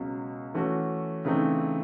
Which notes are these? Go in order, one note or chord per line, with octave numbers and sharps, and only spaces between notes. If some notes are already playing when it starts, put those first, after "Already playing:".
Already playing: C#2 B2 F#3
E3 A3 C#4 F#4
C#3 E3 A3 C4 D#4